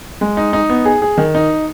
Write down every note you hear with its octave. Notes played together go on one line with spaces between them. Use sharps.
G#3
D#4
D#4
B3
G#4
G#4
D#3
D#4